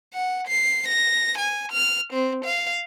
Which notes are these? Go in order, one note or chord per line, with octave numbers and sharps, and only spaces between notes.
F#5
C7
A#6
G#5
F6
C4
F5